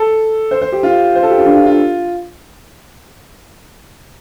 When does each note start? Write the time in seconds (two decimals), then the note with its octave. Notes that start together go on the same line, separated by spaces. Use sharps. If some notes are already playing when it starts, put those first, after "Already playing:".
Already playing: A4
0.51 C5
0.62 C5
0.72 G4
0.83 F4
1.15 C5
1.23 A4
1.30 G4
1.38 F4
1.45 D4
1.56 F4
1.66 F4